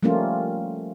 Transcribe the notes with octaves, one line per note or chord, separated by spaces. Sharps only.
F3 G3 A3 A#3 C#4 F4